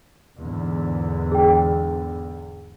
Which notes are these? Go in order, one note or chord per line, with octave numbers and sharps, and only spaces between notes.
E2 G#2 D3
G#4 G5